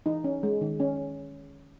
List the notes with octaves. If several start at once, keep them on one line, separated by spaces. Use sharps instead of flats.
E3 D#4
C#4
G#3
D#3
C#4